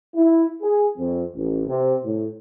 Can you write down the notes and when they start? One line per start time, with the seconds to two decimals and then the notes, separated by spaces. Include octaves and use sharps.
0.16 E4
0.62 G#4
0.98 F2
1.35 A1
1.67 C3
2.04 A2